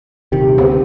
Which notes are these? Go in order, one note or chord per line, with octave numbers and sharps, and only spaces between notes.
D#1 C3 D#3 G4
D2 C#3 B3 C4